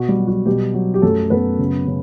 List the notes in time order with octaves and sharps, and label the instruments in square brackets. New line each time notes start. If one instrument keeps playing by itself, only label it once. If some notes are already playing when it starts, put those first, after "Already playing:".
Already playing: [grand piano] B2 F#4
G3 G4
F#3
F#4
B2 G3 G4
F#3
G4
F#2 A3 A4
F#2 B3 B4
C#3
C#3